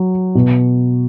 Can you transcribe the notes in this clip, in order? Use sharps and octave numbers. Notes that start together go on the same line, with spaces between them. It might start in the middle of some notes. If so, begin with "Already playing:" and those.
Already playing: F#3
B2